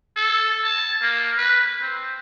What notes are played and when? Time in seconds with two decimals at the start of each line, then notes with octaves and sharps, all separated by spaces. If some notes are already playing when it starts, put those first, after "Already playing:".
0.16 A4
0.64 A5
1.01 A#3
1.37 B4
1.81 C4